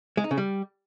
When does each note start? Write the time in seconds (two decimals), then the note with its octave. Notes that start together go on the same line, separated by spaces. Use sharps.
0.17 G#3
0.24 D#4
0.31 C#3
0.37 G3